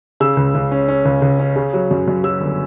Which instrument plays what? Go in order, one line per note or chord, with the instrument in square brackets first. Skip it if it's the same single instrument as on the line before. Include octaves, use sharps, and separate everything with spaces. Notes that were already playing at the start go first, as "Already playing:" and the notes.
[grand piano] C#3 E6
C#2
C#2
C#4
C#4
C#2
C#2
C#4
C#3
F#3
F#2
F#2
F#3 E6
G1